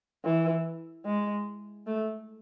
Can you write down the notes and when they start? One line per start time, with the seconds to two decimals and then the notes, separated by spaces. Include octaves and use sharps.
0.25 E3
1.06 G#3
1.86 A3